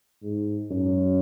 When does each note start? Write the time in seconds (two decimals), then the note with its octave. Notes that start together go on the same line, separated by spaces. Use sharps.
0.22 G#2
0.70 F#2